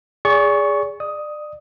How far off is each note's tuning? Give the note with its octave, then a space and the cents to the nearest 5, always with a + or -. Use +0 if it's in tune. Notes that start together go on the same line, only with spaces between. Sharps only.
G#4 -10 D5 -35 C#6 +5
D5 +30 D#6 +10